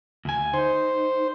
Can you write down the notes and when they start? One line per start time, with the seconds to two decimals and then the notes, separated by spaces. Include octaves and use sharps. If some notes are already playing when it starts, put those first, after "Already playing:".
0.25 D2 G#5
0.54 D#4 C5